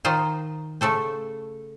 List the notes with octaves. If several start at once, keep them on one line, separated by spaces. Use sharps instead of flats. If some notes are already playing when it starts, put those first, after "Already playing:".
D#3 D#4 F4 C5
C#3 A3 A4 C5